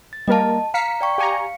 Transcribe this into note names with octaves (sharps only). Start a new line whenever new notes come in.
A6
G3 A#3 A#4 D#5 A5
F5 A#5 B6 C#7
D5 G5 C#6
G4 F5 G#5 A#5 C#7